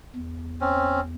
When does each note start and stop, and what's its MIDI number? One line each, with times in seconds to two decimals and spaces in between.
0.16 1.15 40
0.61 1.00 60
0.61 1.00 61